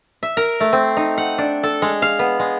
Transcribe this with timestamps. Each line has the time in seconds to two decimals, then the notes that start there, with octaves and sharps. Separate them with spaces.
0.23 E5
0.37 A#4
0.60 A3
0.73 C4
0.97 D#4
1.18 F#5
1.38 D4
1.63 A4
1.82 G#3
2.02 F5
2.19 B3
2.39 G#3